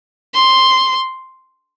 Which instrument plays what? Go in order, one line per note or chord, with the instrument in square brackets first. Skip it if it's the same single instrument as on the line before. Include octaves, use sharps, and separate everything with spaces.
[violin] C6